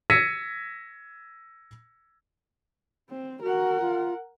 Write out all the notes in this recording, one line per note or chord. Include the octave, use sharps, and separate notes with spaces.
E6 G#6 A#6 B6 C#7 D#7
C4
F#4 A#4 F#5
F4